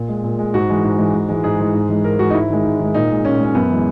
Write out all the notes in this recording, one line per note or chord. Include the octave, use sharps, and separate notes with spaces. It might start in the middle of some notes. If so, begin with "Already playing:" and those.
Already playing: A#2
G#3
A#2
G#3
G#2 F#4
E3 G#3
G#2
E3 G#3
G#2
E3 G#3
G#2 G#4
E3 G#3
G#2
E3 G#3
G#2 A#4
E3 G#3 F#4
D#4
G#2 E4
D#3 G#3
G#2
D#3 G#3
A#2 D#4
G#3
A#2 C#4
G#3 C#4
F#2 B3
E3 G#3